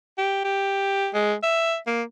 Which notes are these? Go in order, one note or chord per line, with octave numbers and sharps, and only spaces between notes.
G4
G4
G#3
E5
A#3